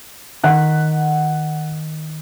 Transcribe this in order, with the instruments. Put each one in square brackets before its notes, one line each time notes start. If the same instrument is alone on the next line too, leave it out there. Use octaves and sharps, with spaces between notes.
[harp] D#3 B6 [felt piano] F#5 F#6